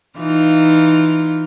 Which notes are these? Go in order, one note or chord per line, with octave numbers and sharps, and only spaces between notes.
E3 D#4 F4